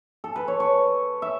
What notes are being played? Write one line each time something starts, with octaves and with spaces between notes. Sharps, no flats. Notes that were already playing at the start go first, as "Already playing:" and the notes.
A4
B4
C#5
C#5
E5